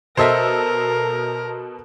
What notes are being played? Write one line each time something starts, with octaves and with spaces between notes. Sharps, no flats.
B2 A4 A#4 C5 D#5 E5 E6